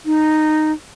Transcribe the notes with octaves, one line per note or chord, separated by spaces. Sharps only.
D#4